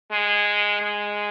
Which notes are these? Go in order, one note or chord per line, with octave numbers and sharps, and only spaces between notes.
G#3
G#3